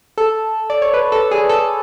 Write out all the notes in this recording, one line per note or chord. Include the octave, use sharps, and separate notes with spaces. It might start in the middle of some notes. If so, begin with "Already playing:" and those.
A4
D5
C#5
B4
A4
G#4
A4